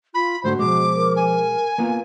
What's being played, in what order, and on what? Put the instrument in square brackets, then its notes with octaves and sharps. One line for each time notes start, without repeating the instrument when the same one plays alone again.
[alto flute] F4 [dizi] B5
[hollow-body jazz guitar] G#2 D3 A3 [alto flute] F#4 [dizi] C5
[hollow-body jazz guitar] B2 G#3 [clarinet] F3 [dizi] D6
[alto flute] A#4
[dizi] G#5
[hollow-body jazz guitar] A#3 B3 F4